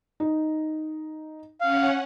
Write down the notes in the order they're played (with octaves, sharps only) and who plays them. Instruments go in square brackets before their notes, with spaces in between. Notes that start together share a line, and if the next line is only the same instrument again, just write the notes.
[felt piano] D#4
[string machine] C#4 F#5 [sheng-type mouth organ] F5